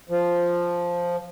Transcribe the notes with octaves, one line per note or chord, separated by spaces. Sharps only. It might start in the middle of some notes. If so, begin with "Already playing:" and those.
F3